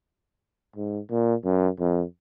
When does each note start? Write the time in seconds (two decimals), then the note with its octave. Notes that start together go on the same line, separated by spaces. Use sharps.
0.76 G#2
1.10 A#2
1.44 F#2
1.80 F2